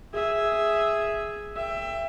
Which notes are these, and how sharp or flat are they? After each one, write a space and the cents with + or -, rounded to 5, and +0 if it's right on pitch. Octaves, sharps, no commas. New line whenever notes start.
G#4 +0 E5 +0
E5 +20 G5 +20